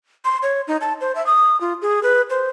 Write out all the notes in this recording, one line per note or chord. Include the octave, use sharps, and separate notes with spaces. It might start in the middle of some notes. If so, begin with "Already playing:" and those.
C6
C#5
D#4
A5
C5
E5
D#6
F4
G#4
B4
C5